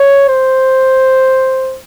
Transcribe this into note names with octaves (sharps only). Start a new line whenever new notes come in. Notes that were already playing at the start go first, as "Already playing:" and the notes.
Already playing: C#5
C5